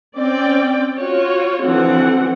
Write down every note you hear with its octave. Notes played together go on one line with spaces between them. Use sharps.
C4 C#4 D5 G5
F4 F#4 C#5
D3 E3 F3 C4 F#4 F#5